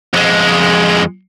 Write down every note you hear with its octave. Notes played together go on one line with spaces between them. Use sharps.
F2 G#3